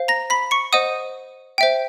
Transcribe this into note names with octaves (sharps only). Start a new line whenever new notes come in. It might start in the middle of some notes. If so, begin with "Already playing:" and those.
Already playing: C5 F5
A#5 A#6
B5 B6
C#6 C#7
C5 D#5 F#5 D#6 D#7
C5 E5 G5